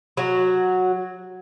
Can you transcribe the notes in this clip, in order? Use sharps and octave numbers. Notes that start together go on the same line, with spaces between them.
F#3 F#4